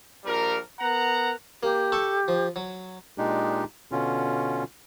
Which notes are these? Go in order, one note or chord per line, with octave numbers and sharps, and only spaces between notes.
A#1 F3 G3 A#4
B3 A#4 F#5 A#5
A#3 G4
A4 A5 C#6
F3
F#3
A#2 G#3 D4 D#4 G4
B2 D3 C#4 F4